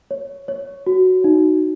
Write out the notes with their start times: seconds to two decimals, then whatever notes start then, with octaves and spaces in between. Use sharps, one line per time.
0.11 C#5
0.48 C#5
0.87 F#4
1.24 D#4